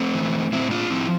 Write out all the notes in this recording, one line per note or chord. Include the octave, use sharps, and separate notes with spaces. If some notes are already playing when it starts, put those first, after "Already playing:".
Already playing: A3 C4
E3
A2 C4 E4
D4 F4
F3 C4 E4